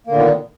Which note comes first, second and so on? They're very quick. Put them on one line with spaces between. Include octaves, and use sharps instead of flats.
A#3 D3 A#2 D#3 B3